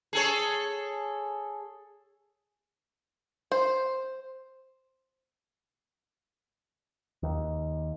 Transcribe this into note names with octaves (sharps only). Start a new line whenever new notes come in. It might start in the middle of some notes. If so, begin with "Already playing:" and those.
G#4 A4 C#5
C5
D#2